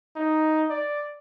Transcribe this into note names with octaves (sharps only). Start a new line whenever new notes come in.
D#4
D5